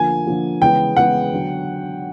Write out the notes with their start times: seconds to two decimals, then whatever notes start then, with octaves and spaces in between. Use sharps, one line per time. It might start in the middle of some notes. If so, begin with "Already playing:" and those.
Already playing: D3 F3 A#3 G#5
0.27 D3 F3 A#3
0.62 C#3 E3 G#3 B3 G5
0.96 C#3 E3 G#3 B3 F#5
1.33 D3 F#3